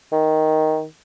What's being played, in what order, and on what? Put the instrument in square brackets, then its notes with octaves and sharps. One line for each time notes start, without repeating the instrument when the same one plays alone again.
[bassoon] D#3